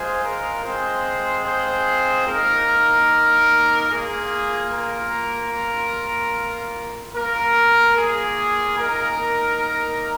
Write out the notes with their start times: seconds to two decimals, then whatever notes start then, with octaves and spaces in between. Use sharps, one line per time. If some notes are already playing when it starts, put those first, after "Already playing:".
Already playing: G#3 F4 G#4 C5
0.23 A#4
0.64 G#3 C4 F4 G#4 C5
1.46 G#4 C5
2.26 A#3 D#4 A#4
3.89 A#3 F4 G#4
4.70 A#4
5.51 A#3 F4
7.14 A#3 F4 A#4
7.96 G#4
8.77 A#3 D#4 A#4